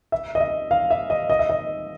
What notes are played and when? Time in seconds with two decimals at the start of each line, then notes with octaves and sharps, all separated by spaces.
0.12 E5
0.35 D#5
0.40 E5
0.71 F5
0.90 E5
1.10 D#5
1.30 D#5
1.39 E5
1.50 D#5